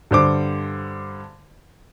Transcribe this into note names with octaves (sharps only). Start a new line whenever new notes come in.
G2 D3 C5 D6